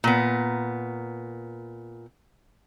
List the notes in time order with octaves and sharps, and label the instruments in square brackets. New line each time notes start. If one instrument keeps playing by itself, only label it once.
[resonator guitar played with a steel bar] A#2 B3